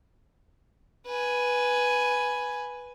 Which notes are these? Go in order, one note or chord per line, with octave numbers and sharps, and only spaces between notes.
B4 G#5